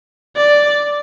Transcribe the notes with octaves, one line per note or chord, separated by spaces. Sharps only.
D5